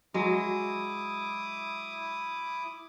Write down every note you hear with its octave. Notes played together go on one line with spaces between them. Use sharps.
F#3 G#3 E4 D6 D#6